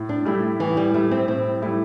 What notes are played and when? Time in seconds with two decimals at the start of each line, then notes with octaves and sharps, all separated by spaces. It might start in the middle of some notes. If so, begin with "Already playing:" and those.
Already playing: A2
0.09 D4
0.25 G3 A3 E4
0.59 A2 E3
0.77 G3
0.94 G3 A3 E4
1.11 C4
1.28 A2 C4
1.62 G3 A3 E4